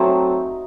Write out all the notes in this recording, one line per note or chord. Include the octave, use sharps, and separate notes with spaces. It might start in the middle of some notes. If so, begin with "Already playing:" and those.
Already playing: F#3 A3 C4 D#4